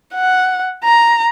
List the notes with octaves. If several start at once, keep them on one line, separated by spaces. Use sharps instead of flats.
F#5
A#5